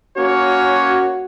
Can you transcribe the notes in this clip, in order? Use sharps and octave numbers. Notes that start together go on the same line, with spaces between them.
A#3 C#4 F#4 C#5